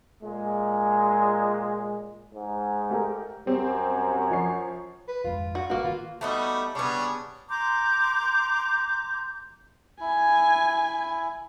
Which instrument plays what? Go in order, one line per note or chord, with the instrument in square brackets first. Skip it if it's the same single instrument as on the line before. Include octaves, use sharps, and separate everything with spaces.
[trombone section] A#2 G#3
[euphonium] G#2
[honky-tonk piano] A3 G4 A#4
[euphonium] F#2 [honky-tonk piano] G3 C4 G4
[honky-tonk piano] F3 C#5 C7
[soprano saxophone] B4
[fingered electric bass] G#1 F2 G#3 [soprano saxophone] F4
[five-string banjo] F#4
[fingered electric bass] G#1 C#4 [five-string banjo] A#3 F#4 [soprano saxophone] B4
[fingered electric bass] D#3 [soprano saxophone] F4
[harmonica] G3 F#4 [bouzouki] A3 B3 D#4
[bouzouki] C#3 B3 [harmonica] G3 D4 C#5
[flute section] A#5 C6 D6 G6
[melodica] E4 [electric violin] G#5